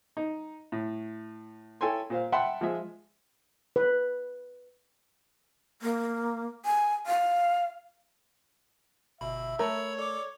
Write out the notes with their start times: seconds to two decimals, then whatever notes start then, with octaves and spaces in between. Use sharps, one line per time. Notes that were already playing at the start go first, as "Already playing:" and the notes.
0.17 D#4
0.72 A2
1.81 E4 A4 C#5 G5 G#5 C6
2.10 A#2 C5 F5
2.32 E5 F#5 G5 A5 B5 C6
2.61 F3 G#3 E5
3.76 B4
5.82 A#3
6.65 G#5
7.07 F5
9.21 G1 B2 E5 B5
9.59 A3 A#4 C#5 B5 E6
9.98 A4 D5 D6